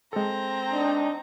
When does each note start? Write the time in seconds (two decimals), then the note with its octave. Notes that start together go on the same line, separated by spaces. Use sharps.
0.13 G#3 C4 A4 A#5
0.73 D4 D#4